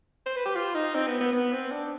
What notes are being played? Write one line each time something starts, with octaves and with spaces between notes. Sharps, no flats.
C5
B4
G4
F4
D#4
C4
B3
B3
B3
C4
D4